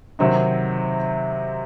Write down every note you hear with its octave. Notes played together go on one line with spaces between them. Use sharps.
C3 D#3 F#3 C4 D#4